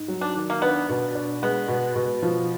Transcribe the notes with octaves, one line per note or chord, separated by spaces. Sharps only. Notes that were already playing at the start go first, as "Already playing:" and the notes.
Already playing: G#2
F#3
D4
D#3
A#3
B3 D4
B2
D4
G#3 B3
B2
B2
F3